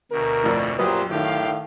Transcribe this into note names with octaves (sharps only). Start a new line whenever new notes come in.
D2 B2 A#4
F2 A2 D5
F#2 A#2 F#3 G4 B4 C5 D#6
A2 D#3 G4 F5